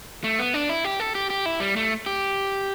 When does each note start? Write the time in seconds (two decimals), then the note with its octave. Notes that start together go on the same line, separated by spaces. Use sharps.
0.24 A3
0.39 B3
0.54 D4
0.69 E4
0.84 G4
1.00 A4
1.15 G4
1.30 G4
1.46 E4
1.60 G3
1.76 A3
2.06 G4